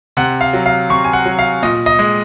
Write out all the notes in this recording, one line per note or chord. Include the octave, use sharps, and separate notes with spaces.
C3 F#5
F5
F#3
F5
C3 C#6
G#5
F#5
F#3
F5
A#2 D#5
D#5
G#3